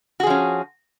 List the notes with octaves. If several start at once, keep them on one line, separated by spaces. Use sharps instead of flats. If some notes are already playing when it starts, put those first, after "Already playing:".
F3 C#4 F#4 G#4